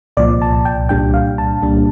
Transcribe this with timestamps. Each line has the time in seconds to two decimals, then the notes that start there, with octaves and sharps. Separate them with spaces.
0.17 C2 A#2 F3 D5
0.42 A5
0.65 G5
0.89 C2 A#2 G3 D4 G5
1.14 F5
1.38 A5
1.62 C2 A#2 G3 D4